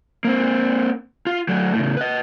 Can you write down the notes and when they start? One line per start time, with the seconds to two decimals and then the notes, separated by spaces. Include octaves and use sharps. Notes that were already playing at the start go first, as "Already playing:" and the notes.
0.25 A#3 C4
1.27 F4
1.48 F#3 A3
1.75 A2 C#3
1.97 B4 D#5